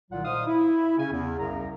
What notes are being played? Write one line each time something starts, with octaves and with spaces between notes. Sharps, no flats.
C2 A#2 D#3 F#3 F4 F#5
A#2 D#4 C5 F5 D#6
E4
C#3 C#4 G#5
E2
C2 F#2 C#3 A#5